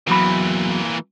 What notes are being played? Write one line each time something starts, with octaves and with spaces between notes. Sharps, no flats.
E2 A#2 E3 F#3 B5